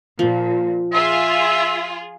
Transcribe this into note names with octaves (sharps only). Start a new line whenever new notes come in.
A#2 F3
F4 G#4 E5